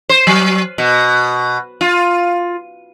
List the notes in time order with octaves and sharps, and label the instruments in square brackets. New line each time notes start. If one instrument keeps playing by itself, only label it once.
[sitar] C5
F#3
B2
F4